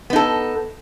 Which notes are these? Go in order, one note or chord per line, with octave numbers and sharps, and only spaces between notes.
B3 D#4 A4